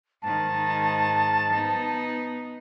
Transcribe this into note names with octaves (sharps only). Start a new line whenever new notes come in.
G#2 D#3 A5
B3 D#4